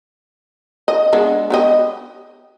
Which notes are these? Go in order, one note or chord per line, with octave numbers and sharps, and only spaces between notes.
D#5
G#3 B3 D4
B3 G4 D#5